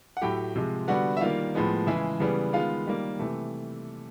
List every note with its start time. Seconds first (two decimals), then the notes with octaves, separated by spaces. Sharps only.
0.17 F#5
0.22 A2 F#3 A3 G4 G5
0.56 C3 F3 G#3
0.88 D3 G3 B3 F#4 F#5
1.17 E5
1.21 D#3 G3 A#3 F4 F5
1.55 A2 F3 G#3 B3
1.87 C#3 E3 G#3 E4 E5
2.20 C#3 E3 G3 B3
2.53 D#3 G#3 B3 F4 F5
2.86 D#3 G3 A#3
3.19 C3 E3 A3